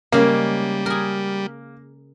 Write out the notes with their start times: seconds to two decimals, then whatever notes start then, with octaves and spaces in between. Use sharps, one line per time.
0.12 C#3 G3 G#3 A#3
0.86 G#4 A#4